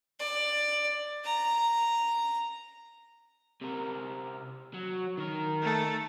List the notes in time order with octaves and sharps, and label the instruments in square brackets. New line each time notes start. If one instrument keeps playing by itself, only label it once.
[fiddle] D5
A#5
[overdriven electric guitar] C3 A#4
F#3
D#3 A#4
[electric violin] A3 A4